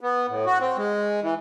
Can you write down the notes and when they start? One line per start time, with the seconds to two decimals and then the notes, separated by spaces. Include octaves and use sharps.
0.01 B3
0.29 A2
0.46 F#4
0.60 C4
0.77 G#3
1.23 E3